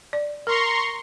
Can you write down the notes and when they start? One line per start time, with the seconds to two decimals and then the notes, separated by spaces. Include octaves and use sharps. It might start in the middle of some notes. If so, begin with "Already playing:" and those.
0.13 D5
0.47 A#4 A#5 C6 C#6